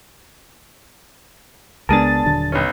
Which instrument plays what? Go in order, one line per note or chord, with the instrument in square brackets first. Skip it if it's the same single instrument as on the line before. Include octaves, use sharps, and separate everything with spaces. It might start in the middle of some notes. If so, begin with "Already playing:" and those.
[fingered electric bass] C#2 G#3 B3 [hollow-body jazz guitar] D4 G#4 A#4 [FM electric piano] A5 A6
[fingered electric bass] D#1 D3 F#3
[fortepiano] B1 C#4